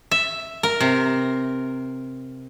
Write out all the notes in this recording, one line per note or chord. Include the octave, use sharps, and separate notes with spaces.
E5
A#4
C3